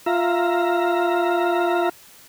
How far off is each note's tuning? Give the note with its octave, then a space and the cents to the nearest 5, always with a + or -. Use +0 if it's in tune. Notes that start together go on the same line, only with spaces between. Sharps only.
F4 +0 E5 +15 A#5 +0